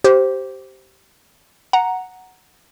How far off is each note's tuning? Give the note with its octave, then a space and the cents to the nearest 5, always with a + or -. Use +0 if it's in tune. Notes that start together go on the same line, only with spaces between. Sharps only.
G4 -20 C5 +0
F#5 +0 A#5 +0